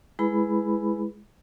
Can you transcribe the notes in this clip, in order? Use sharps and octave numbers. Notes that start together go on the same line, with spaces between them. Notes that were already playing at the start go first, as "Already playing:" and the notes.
G#3 E4 G#4 B4 B5